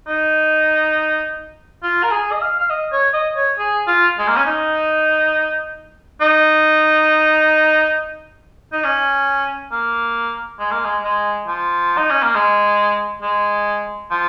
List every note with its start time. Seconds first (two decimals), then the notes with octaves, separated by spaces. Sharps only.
0.07 D#4
1.82 F4
2.03 A#4
2.11 G#4
2.31 D#5
2.41 F5
2.59 F5
2.70 D#5
2.93 C#5
3.14 D#5
3.36 C#5
3.59 G#4
3.87 F4
4.18 G#3
4.28 A#3
4.37 C#4
4.46 D#4
6.21 D#4
8.72 D#4
8.84 C#4
9.72 A#3
10.59 G#3
10.72 A#3
10.84 G#3
11.04 G#3
11.47 F3
11.97 D#4
12.10 C#4
12.22 A#3
12.35 G#3
13.22 G#3
14.11 F3